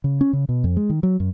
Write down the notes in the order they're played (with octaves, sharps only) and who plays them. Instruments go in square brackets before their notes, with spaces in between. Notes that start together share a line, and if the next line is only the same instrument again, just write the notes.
[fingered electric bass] C#3
C#4
C#3
B2
F2
G#3
D#3
F#3
F#2